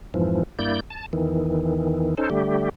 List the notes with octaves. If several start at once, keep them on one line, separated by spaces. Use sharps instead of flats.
F2 G#2 E3 F3
G2 A#3 E4 D5 G6
A5
E2 D#3 E3
C#4 D#4 A4 C5
D3 G3 A3 G4